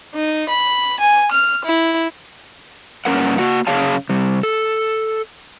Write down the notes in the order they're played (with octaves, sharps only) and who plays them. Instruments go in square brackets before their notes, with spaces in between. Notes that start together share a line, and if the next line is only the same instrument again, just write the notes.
[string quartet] D#4
B5
G#5
F6
E4
[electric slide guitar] G2 A#3 C#4 A4 A#4 F#5
A#3 F#4 F#5
F#2 C#3 G#4 C#5 F5 A5
C3 G3
A4